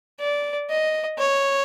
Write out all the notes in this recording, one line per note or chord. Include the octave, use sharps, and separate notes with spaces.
D5
D#5
C#5